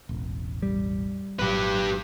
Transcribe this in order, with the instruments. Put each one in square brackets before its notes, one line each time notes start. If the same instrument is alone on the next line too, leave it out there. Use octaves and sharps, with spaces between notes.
[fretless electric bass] E1 A1
[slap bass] G3
[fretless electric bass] G#1 A#2 F#3 [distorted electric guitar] G4 B4